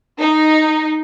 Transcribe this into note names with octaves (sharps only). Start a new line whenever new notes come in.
D#4